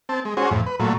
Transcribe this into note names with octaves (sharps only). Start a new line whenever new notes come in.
C4 A5
G#3
C#4 F#4 G#4 C5
F2 A2
B4
A#2 F#3 A3